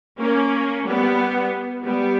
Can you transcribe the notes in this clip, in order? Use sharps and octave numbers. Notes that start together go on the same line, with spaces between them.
A#3 C#4
G3 B3
G3 B3